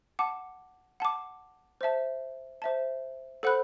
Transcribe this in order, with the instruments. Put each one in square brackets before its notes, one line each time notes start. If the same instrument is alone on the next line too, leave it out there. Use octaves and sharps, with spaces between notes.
[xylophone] F#5 A5 D6
F#5 A5 D6
C5 E5 A5
C5 E5 A5
A4 C5 F#5 B5 F#6